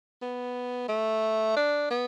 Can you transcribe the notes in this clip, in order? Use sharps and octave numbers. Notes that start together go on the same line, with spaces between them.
B3
A3
D4
B3